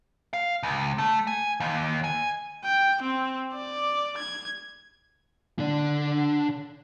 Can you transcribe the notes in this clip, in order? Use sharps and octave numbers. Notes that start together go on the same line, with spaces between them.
F5
C#2
A3
G#5
D#2
G#5
G5
C4
D5
G#6
D3 D4